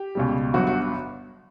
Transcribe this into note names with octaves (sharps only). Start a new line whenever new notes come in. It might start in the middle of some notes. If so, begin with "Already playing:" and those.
Already playing: G4
C#2 B2 G3
G1 G2 F#3 B3 F#4
F#4